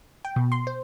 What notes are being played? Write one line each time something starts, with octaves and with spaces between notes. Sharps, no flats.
G5
B2
C6
C5